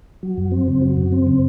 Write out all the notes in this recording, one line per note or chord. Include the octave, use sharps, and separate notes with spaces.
F#3
F#2
C4
C#3
F#3
F#2
C4
C#3